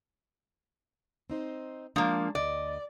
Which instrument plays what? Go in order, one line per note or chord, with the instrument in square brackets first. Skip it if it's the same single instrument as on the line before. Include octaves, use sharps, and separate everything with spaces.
[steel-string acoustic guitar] C4 D#4 C5
[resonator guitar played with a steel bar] F3 A#3 [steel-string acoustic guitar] G#3 D4
[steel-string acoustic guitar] D2 D#5 [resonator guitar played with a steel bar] D5